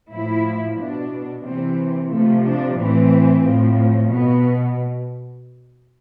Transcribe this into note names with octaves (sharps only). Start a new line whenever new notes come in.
A2 F3 E4
B2 D4
C3 E3 C4
C3 F3 A3
D4
A2 E3 C4
A2 F3
B2 B3